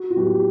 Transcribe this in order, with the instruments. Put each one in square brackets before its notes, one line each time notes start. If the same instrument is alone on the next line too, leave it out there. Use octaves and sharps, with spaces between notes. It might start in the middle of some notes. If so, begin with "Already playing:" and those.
Already playing: [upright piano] F#4
F#4
A2 F#3 B3 G4
G4